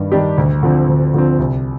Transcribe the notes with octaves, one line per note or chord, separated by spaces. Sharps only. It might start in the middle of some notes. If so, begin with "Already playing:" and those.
Already playing: G2 D#3 G3
D#3 G3 D4 G4
D2
D3 F3 C4
D2
D3 F3 C4
C2